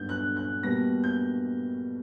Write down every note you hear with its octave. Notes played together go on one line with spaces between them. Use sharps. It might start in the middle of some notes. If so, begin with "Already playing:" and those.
Already playing: G2 F#3 B3 D4 G6
F#6
F#6
B2 G3 A#3 A#6
G6